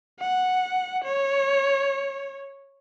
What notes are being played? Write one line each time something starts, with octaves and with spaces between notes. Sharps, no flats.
F#5
C#5